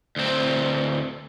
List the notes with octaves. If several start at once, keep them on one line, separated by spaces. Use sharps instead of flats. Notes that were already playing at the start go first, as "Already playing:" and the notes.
D2 C4